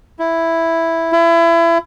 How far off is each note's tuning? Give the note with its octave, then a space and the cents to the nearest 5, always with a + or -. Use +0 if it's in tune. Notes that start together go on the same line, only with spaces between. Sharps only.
E4 +0
E4 +30